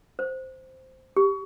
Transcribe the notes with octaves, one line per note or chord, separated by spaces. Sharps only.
C5
G4